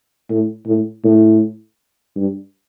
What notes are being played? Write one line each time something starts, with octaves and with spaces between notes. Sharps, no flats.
A2
A2
A2
G2